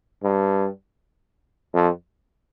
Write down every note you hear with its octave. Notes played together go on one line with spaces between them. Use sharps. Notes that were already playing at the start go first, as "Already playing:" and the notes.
G2
F2